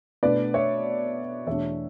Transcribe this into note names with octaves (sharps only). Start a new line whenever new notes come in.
B2 A3 D4 B4 D5
C#5 E5
E2 B2 A3 D4 C#5 E5